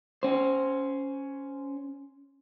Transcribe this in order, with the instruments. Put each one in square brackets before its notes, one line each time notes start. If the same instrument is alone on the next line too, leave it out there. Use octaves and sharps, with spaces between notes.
[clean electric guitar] C#4 C5